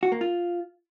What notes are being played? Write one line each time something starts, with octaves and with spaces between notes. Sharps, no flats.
F#4
A#3
F4